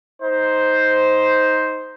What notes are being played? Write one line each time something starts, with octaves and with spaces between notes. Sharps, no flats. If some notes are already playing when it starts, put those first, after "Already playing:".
D#4 C5